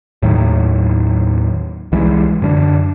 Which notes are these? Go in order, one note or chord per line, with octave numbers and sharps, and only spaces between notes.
D#2 A2 D#3 F#3
C2 E3 G3 G#3
F#2 D3 C#4 D4